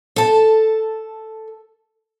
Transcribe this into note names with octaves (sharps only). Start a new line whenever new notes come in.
A4 A5